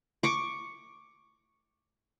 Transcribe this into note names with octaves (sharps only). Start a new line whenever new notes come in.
C#6 D6